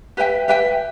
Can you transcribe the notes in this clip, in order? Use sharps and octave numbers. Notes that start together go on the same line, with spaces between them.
G4 B4 E5 G5
G4 B4 E5 G5